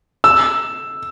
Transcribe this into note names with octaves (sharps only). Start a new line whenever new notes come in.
E6